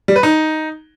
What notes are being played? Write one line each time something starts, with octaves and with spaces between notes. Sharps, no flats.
G3
B4
D#4